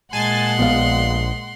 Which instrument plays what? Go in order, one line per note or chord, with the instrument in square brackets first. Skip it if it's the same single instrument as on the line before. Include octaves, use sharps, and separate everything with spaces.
[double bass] A#2 G#3 [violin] F#5 C6 [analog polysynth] G#5 A5 A6
[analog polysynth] A#1 [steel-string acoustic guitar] B3 D5 F5